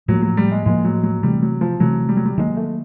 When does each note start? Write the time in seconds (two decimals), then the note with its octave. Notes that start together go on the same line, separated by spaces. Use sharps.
0.08 A2 F3 F#3 A#3
0.22 F#3
0.37 G3
0.51 G#3
0.66 A2 F3 G#3 A#3
0.85 F#3
1.03 F#3
1.23 C3 E3 G3 A3
1.42 F#3
1.61 F3
1.80 C3 E3 F#3 A3
2.09 G3
2.17 F#3
2.25 G3
2.38 D#3 F#3 G#3 A#3
2.56 A3